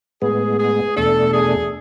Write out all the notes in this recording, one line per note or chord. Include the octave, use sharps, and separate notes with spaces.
A2 G#3 B3 G#4
G#4
E2 B2 A3 D4 A4
G#4